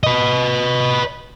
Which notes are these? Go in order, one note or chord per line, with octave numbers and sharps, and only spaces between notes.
B4 D#5